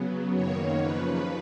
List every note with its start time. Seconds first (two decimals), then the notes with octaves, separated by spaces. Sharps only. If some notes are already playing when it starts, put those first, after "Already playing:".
Already playing: C#3 F#3 B3
0.32 F#2 D#3 A#3 C#5
0.79 D#2 C#3 F3 B4